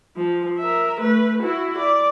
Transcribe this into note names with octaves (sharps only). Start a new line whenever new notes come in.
F3
A#4 E5
A3 B4
E4 F#4
D5